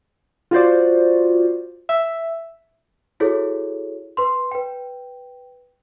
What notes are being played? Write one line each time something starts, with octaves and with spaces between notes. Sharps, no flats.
F4 F#4 C5 D5
E5
E4 F#4 G#4 A4 C#5
B4 C6
B4 G5